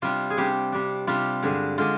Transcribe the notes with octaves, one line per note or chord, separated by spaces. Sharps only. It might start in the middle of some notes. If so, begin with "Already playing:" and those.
C3 G3 D4 F4
G#4
C3 G3 D4 G4
C3 G3 D4
C3 G3 D4 F4
G2 D3 G#3 D4
D3 G#3 D4 F4